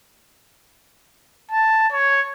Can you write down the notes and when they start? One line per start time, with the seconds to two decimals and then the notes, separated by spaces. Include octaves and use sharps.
1.51 A5
1.92 C#5